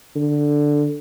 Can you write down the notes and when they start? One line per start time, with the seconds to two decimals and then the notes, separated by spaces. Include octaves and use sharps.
0.16 D3